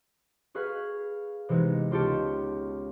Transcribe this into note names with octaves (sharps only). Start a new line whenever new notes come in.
F#4 G#4 B4 F5
C3 E3 G#3 B3 D#4
C#2 F4 G4 A5 C#7